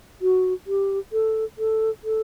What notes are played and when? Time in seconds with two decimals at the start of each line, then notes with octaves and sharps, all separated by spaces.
0.22 F#4
0.67 G4
1.13 A4
1.58 A4
2.04 A4